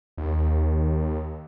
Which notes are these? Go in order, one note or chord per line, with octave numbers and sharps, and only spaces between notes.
D#2